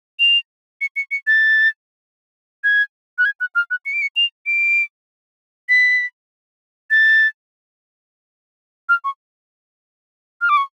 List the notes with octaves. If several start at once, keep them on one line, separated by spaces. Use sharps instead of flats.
F7
C#7
C#7
C#7
A6
G#6
F#6
G#6
F#6
F6
F#6
C#7
D7
C#7
F7
D7
B6
A6
F6
C#6
F6
D6
C#6